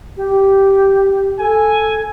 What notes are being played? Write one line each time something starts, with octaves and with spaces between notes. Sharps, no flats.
G4
A4 G#5